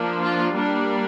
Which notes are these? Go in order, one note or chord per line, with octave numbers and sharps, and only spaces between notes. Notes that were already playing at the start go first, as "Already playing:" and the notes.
Already playing: F3 A#3 D4
F4
G3 A#3 D4